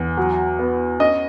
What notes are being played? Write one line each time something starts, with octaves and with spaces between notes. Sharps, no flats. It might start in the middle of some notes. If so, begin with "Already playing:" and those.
Already playing: E2
F#3
B3
C#4 D#5